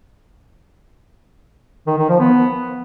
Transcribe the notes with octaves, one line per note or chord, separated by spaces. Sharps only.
D#3
D#3
F3
B3